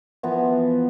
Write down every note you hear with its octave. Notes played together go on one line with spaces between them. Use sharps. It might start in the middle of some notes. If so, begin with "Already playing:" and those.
E3 F3 B3 F4